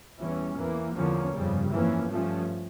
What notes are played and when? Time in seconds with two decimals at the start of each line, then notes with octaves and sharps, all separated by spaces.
0.19 E2 E3 G3 C#4
0.57 E2 E3 A#3
0.95 E2 D3 F3 A#3 C#4
1.33 G1 F2 C#3 G3
1.71 F2 E3 A#3 C#4
2.10 G2 F3 A3 C#4